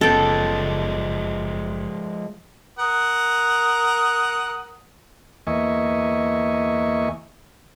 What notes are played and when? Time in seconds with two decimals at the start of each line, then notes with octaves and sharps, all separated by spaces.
0.01 F#1 F3 G#3 B3 C#4 A4 G5
2.79 A#4 F#5 D#6
5.47 E2 A#3 D#5 E5 G#5 C#6